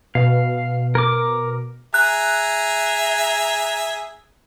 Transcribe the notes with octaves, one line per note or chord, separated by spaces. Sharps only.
B2 F5
A#4 D6
G#4 E5 A#5 F#6